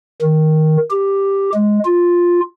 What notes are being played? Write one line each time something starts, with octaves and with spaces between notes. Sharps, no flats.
D#3
G4
G#3
F4